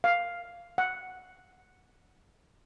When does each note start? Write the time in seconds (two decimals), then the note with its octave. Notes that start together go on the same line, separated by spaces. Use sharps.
0.04 F5
0.78 F#5